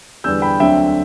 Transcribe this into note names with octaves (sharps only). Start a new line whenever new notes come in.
E2 D3 G3 B3 E6 G6
G5 B5
D2 D3 F#3 C4 E5 G5